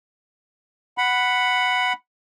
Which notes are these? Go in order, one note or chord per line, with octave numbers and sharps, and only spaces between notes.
F#5 B5